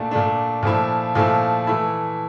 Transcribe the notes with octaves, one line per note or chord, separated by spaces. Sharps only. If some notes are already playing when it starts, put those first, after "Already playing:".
Already playing: A#2 A3 D4
A#2 A3 D4
A#2 F3 A3 E4
A#2 F3 A3 E4
E3 A3 E4